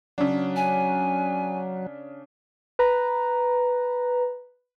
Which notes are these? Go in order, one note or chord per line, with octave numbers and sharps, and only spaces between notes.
C#3 F#3 D4
G#5
B4 A#5